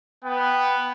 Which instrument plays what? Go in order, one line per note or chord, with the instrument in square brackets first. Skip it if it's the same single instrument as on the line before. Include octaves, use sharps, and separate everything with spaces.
[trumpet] B3 [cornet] G5